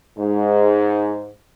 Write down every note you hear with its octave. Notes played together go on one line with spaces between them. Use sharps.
G#2